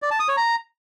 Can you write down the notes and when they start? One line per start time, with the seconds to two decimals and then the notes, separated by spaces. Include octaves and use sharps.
0.02 D5
0.11 A5
0.20 D#6
0.28 C#5
0.37 A#5